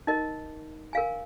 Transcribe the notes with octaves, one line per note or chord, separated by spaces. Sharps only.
D#4 A#4 D#5
A#4 F5 G#5